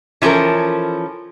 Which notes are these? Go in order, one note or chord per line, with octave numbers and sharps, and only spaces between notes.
E3 F3 C#4 A4 A#4